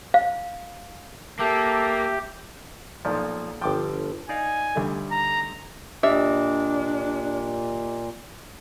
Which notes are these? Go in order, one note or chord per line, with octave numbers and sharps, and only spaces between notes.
F5
A#3 G4 A4 E5
B1 A#2 F3
G1 F3 G5 D6
D#4 D5 F5 G#5
D2 G3 A3
A#5
A#2 D4 G4 D#5 E5